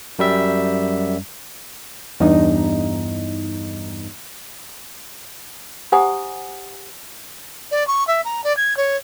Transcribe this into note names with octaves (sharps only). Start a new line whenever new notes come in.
F#2 G3 E5
E2 G2 D#4
G4 C5 F#5 G#5 A#5 D#6
D5
C#6
E5
A#5
D5
G#6
C#5